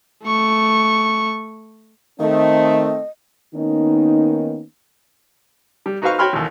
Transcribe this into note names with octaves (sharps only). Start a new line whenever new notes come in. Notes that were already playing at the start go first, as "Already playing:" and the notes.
A3 C#6
D#3 A3 C4 D#5
D#3 A#3 B3 C#4 D#4
G3
D#4 F#4 B4 C5 F5 C#6
F#4 C#5 G5 B5 C6 F6
A1 D#2